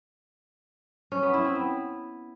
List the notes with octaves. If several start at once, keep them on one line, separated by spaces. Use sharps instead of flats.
C#4
B3
E4
C4
B3